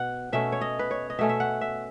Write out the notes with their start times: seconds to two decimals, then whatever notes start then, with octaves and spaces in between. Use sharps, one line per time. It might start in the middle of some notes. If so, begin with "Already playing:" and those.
Already playing: B2 F#5
0.33 B2 A3 C#4 E5
0.52 C#5
0.61 D#5
0.79 B4
0.91 C#5
1.10 D#5
1.19 B2 A3 C#4 E5
1.29 E5
1.40 F#5
1.61 E5